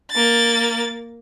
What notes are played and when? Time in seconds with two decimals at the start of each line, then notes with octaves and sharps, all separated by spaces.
0.11 A#3 A6